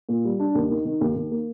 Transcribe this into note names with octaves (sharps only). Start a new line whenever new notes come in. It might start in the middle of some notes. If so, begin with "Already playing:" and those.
A#2
G3
D4
D#2
D#3
D#3
D#2
D#2
A#3